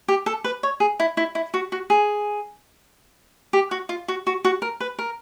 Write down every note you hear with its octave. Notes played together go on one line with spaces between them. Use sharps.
G4
A4
B4
C#5
G#4
E4
E4
E4
F#4
F#4
G#4
G4
F#4
F4
F#4
F#4
F#4
A#4
B4
A#4